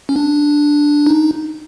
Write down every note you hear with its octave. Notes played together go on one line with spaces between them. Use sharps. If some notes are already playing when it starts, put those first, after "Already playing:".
C#4
D4
D#4